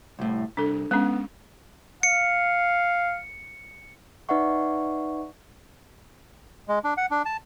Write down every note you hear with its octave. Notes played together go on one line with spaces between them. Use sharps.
C2 A2
C2 D4 A4
G#3 B3 C#4
F5 C#7
D#4 B4 D5 E5 F#5 C#6
G#3
D4
F#5
D4
A5